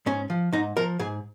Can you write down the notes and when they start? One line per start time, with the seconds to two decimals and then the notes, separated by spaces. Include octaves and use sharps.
0.06 G#2 C#4
0.30 F3
0.53 G#2 D#4
0.77 F3 A#4
0.99 G#2 G#4